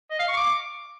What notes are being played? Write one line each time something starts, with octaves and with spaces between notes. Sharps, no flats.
D#5
F5
C#6
D6